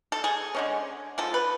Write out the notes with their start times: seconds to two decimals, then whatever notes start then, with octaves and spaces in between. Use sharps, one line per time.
0.12 A4
0.24 G#4
0.55 D3 G#3 C#4
1.18 D3 F3 G#3 A4
1.34 B4